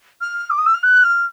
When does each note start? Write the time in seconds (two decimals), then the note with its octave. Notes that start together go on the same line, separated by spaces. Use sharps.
0.21 F6
0.50 D6
0.58 D#6
0.66 E6
0.74 F6
0.83 F#6
1.03 F6